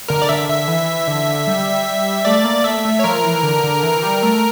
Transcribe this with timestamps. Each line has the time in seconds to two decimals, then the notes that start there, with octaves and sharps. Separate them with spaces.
0.09 D3 A#4
0.22 D5
0.29 D3 E5
0.49 D3 E5
0.68 E3
1.07 D3
1.47 G3
2.25 A3 D5
2.45 A#3
2.64 A3 E5
2.85 A3
2.99 C#5
3.04 F3 A#4
3.24 E3
3.43 D3
3.63 D3
3.83 E3
4.02 G3
4.23 A3